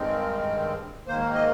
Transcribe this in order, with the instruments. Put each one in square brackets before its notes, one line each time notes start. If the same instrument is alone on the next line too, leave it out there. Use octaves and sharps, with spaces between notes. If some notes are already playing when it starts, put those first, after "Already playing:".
Already playing: [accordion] G2 D#3 G#3 C4
G#2 D#3 A#3 C5
D#5